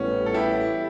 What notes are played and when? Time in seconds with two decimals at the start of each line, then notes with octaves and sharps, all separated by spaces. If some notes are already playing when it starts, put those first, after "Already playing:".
Already playing: A1 A2 G3 B3 C#4
0.26 A4
0.34 E4 G4